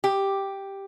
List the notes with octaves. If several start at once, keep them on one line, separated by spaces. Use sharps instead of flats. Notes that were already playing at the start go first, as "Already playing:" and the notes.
G4